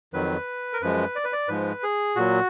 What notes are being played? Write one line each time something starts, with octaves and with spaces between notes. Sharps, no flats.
F2 D#3 F#3 B4
A#4
F#2 F3 G#3 B4
D5
B4
D5
G#2 F3 G#3 B4
G#4
A#2 F#3 F#4